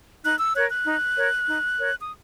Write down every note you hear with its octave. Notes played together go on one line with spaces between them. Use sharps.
D#4 F#6
E6
A#4 C#5 F#6
F#6
D#4
A#4 C#5
D#4
A#4 C#5
D#6